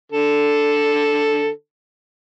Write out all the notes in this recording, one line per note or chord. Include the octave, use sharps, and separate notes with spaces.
D3 A4